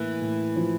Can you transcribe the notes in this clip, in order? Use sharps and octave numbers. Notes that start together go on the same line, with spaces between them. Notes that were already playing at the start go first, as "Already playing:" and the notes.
Already playing: A2 E3 A#3
A2
F3